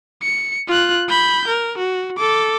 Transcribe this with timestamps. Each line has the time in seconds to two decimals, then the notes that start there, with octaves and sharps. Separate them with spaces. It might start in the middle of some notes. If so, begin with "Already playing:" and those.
0.22 C#7
0.68 F4 F#6
1.09 B5 G6
1.48 A#4
1.78 F#4
2.17 A4 D6